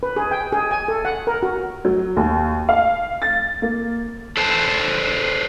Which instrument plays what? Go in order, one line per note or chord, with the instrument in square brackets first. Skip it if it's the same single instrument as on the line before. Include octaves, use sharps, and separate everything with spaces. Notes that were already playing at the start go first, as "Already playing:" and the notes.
[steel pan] B4
G#4
G5
G#4
G#5
A4
F#5
A#4
F#4
[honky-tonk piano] F#3
D#2
F5
A6
A#3
[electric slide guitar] A4 B4 C5 A5